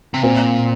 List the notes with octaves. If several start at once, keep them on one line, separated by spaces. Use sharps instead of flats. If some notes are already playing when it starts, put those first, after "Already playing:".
C3
A#2 C4